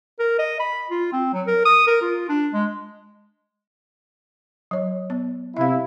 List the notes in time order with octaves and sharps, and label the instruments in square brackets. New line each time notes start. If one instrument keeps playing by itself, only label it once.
[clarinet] A#4
D#5
B5
F4
C4
F#3
A#4
D#6
A#4
F4
D4
G#3
[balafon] F#3 C#5
B3
[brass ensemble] C3 E4 [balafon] E5 F5